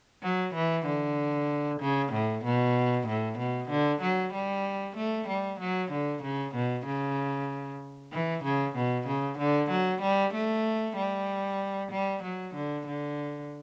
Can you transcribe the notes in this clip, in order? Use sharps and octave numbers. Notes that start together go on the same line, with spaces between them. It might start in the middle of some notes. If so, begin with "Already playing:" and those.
F#3
E3
D3
C#3
A2
B2
A2
B2
D3
F#3
G3
A3
G3
F#3
D3
C#3
B2
C#3
E3
C#3
B2
C#3
D3
F#3
G3
A3
G3
G3
F#3
D3
D3